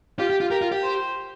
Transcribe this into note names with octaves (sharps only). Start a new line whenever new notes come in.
F4 G4
G4
F4
G4 A#4
F4
G4
C5